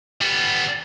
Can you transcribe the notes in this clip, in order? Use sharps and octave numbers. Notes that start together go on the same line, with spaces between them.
G3 B3